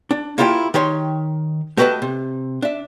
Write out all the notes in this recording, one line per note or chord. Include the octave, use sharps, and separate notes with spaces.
D4
A#3 E4 F4 G4 F#5 G5
D#3 G4 C#5 C6
A3 F#4 G4 B4 D#5 A5
C3
D4 E5